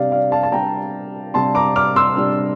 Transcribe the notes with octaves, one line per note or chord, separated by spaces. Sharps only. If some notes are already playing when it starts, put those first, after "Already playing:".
Already playing: C3 G3 D4 D5 F5
D5 F5
F5 A5
A5
C3 G3 D4 G5 A#5
C3 G3 D4 A5 C6
A#5 D6
D6 F6
C6 E6
C3 G3 D4